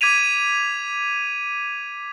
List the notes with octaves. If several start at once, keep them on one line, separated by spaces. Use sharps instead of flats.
D6 G#6 B6 D#7 F7